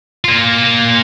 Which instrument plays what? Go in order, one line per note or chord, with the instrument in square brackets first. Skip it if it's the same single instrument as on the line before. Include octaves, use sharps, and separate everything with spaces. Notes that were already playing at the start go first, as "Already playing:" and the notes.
[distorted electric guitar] A#3 F4